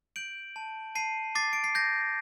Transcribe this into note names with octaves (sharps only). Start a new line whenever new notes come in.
G6 D7 F#7
A5
A5 C7 D#7
D6 A6 C7
D7
C7
G6 A#6